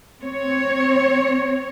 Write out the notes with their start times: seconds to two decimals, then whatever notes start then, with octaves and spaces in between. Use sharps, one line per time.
0.21 C4 C#5